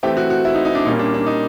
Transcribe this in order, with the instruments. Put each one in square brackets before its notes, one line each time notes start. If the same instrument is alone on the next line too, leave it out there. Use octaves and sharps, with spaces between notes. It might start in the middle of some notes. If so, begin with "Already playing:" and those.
[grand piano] E3 A3 C4 G4
F#4
F#4
E4
D#4
D#4
D4
A#2 G3 A#3 C#4 D#4
D4
D4
D#4